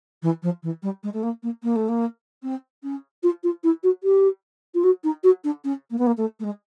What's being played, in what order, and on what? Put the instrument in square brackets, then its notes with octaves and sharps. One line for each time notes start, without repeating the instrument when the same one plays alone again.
[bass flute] E3
F3
E3
G3
G#3
A3
A#3
A#3
A#3
A3
A#3
C4
C#4
F4
F4
E4
F#4
G4
F4
F#4
D#4
F#4
D4
C#4
A#3
B3
A#3
A3
A3
G#3